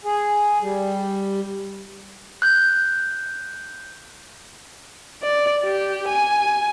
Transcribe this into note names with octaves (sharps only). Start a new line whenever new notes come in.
G#4
G3
F#6 G6
D5
G4
G#5